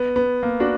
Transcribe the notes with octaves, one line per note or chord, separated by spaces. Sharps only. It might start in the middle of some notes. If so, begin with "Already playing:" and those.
Already playing: B3
B3
A#3
D4 F#4